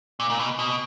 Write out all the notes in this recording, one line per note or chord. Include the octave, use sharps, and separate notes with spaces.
A#2
A#2
B2
B2